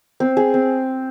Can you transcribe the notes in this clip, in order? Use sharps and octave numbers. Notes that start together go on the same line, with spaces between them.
C4
G#4
C4